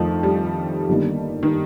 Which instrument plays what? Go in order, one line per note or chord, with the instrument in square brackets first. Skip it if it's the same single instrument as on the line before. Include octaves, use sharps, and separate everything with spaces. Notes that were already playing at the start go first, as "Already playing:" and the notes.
Already playing: [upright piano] F2 D#3 A3 [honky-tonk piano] F3
[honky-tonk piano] G3
[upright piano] G1 G2 D#3 A#3
[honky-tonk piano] D#3